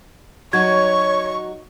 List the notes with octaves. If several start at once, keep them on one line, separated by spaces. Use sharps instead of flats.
F#3 D#4 F#4 C#5 C#6 G#6